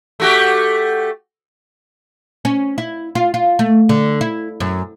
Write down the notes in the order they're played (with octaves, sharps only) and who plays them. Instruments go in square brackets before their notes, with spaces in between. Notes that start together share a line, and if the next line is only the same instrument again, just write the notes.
[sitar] A3 F#4 G4
[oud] C#4
E4
F4
F4
A3
D3
E4
F#2